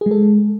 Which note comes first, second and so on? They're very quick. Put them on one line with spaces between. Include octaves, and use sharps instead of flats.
G#4 G#3 A4